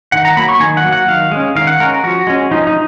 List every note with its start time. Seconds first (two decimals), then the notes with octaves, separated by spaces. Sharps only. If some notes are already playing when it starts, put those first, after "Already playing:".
0.12 D#3 F#5
0.25 A#5
0.37 F#3 A#3 B5
0.49 C#6
0.60 D#3 G#5
0.77 F#5
0.84 F#3 A#3
0.93 F#5
1.08 D#3 F5
1.32 G#3 C#4
1.55 D#3 F5
1.67 F#5
1.80 G#3 C#4 A#4
2.03 F3 F#4
2.27 G#3 C#4
2.51 F3 D#4
2.67 D#4